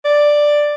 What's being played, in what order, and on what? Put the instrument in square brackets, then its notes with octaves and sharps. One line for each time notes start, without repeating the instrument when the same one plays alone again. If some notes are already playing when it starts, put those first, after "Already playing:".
[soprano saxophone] D5